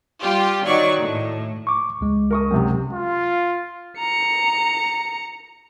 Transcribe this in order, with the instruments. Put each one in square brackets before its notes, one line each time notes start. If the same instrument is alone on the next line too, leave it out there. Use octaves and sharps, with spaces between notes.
[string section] G3 F4 G4
D#3 F#3 D5 C#6
A2
[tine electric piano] C#6 D6
C#2 G#3
[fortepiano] A#4 C#6 D#6
F#2 C3
[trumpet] F4
[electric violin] A#5 C#7